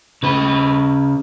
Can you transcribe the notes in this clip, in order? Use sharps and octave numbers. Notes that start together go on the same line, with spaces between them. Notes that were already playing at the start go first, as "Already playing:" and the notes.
C#3 B4